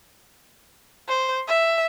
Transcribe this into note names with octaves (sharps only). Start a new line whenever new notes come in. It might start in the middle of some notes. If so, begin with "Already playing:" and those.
C5
E5